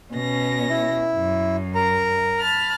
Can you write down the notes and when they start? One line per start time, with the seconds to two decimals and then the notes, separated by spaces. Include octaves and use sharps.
0.13 B2 C#4 A#6
0.70 E4
1.16 F#2
1.75 A#4 A#5
2.38 A5 B5 F6